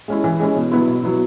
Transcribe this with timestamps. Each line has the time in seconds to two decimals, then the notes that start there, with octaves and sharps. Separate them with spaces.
0.08 G#3 C#4 E4
0.24 E3
0.40 G#3 C#4 E4
0.56 B2
0.72 F#3 B3 E4
0.88 B2
1.03 F#3 B3 E4